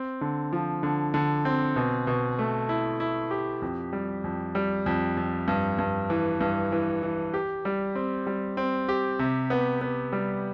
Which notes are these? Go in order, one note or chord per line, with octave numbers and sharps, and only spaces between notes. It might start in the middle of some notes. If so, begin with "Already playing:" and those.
Already playing: C4
D3
F3
D3
D3
C4
B2
B2
A3
E4
E4
G4
F2
G3
F2
G3
F2
F2
G2
G2
E3
G2
E3
E3
G4
G3
C4
G3
C4
G4
C3
B3
B3
G3